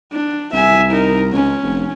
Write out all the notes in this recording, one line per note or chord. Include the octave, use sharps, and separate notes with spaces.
D4
C2 E5 G#5
D#4 A#4
C#2 C#4
F1